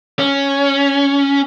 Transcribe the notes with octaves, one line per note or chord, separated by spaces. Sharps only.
C#4